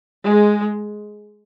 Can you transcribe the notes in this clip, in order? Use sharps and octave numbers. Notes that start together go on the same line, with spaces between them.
G#3